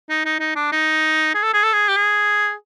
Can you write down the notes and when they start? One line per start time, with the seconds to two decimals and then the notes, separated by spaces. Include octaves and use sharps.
0.10 D#4
0.25 D#4
0.40 D#4
0.56 D4
0.72 D#4
1.34 G#4
1.43 A4
1.54 G#4
1.63 A4
1.73 G#4
1.89 G4
1.97 G#4